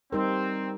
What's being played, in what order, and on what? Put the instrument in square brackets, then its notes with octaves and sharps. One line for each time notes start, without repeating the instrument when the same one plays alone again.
[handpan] G3 D#4 G4 A#4 [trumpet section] C4